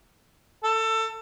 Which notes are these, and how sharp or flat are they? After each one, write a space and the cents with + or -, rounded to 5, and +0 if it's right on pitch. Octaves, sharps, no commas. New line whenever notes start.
A4 +20